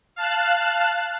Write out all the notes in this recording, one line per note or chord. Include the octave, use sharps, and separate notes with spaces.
F5 A5 F#6